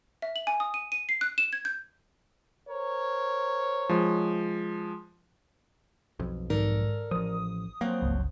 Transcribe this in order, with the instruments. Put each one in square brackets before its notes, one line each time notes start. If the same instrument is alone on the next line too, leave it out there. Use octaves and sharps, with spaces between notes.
[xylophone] E5
F#7
G#5
D#6
D#7
D#7
C7
F#6
E7
G#6
G6
[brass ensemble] A#4 C5 C#5
[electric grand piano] F3 G#3
[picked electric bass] B1 F2
[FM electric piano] G#2 D#3 [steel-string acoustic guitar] A4 A#4 D5
[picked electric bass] A1 F3 [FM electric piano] D#6
[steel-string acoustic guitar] F3 F#3 C4 [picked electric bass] A#3
[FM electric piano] G1 C#2